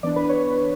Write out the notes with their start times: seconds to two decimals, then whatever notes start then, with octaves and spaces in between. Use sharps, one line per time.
0.03 E3 B3 D4 D5
0.16 B4
0.29 C#5